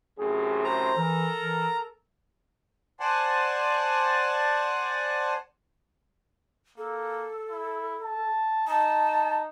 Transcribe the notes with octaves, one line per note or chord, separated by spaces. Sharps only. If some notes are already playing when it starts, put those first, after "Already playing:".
F#2 A2 C3 G#4
C5 A#5
E3 A4 A#4
E3
C5 D5 F#5 G#5 A5
A#3 A4
E4
A5
D#4 A5